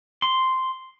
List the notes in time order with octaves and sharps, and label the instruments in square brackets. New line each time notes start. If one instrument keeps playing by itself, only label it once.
[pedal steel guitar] C6